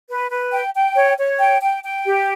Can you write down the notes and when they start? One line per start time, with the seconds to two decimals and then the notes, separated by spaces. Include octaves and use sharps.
0.09 B4
0.30 B4
0.52 G5
0.74 G5
0.96 C#5
1.18 C#5
1.40 G5
1.62 G5
1.84 G5
2.06 G4